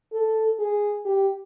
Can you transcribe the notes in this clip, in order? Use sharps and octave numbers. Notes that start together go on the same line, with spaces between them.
A4
G#4
G4